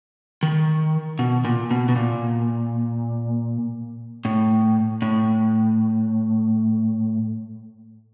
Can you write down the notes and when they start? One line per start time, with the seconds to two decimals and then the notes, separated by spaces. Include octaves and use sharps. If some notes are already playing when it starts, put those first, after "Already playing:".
0.43 D#3
1.19 B2
1.45 A#2
1.71 B2
1.89 B2
1.96 A#2
4.25 A2
5.02 A2